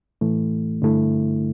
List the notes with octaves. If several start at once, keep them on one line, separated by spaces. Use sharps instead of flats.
A2 E3 A3
G2 D3 A3 E4